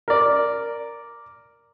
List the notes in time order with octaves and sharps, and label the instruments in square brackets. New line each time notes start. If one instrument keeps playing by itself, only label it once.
[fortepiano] A#4 D5